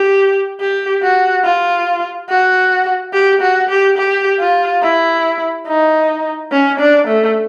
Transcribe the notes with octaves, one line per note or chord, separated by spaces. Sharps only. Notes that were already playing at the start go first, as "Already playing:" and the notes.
Already playing: G4
G4
F#4
F4
F#4
G4
F#4
G4
G4
F4
E4
D#4
C#4
D4
A3